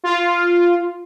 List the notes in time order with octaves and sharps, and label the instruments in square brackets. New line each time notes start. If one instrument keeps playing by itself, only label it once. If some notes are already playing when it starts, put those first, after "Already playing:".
[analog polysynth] F4